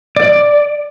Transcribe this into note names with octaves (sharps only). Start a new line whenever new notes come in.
D5